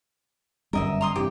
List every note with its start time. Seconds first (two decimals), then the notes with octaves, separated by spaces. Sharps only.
0.73 G1 F#2 G3 A#4 D#5 E5
1.01 A#5 C6 D#6
1.16 G2 C3 E3 G4